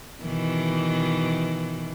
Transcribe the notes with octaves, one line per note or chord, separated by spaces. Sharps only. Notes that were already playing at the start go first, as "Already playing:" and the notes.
B2 D#3 E3